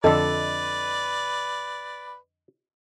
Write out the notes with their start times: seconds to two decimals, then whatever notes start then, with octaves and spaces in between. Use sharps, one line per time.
0.04 F2 D3 A4 B4 D5 D#5